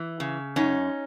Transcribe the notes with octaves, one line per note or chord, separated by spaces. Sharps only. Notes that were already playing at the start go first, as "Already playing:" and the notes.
Already playing: E3
C#3
F#2 C#4 D#4